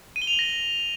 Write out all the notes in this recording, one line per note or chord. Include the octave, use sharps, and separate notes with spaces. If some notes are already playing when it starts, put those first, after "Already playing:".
D#7
G7
F7
F#7
A#6